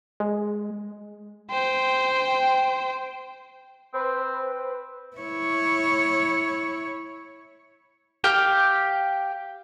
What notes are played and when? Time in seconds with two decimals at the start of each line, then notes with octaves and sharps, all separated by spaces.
0.20 G#3
1.51 C5 G5
3.94 C4 B4 C5
5.17 E4 C#5
8.24 G4 F5 G5